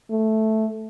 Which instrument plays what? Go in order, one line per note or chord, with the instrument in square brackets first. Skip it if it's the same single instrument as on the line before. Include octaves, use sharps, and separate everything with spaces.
[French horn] A3